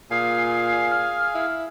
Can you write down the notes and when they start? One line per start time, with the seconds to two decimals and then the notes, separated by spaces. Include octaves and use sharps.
0.11 A#2 G#4 F5 G#5 C7
0.92 F6
1.35 E4